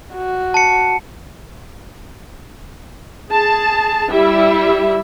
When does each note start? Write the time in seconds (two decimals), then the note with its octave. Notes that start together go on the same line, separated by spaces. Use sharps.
0.14 F#4
0.54 A5 C#7
3.30 G#4 A5
4.10 G3 E4 E5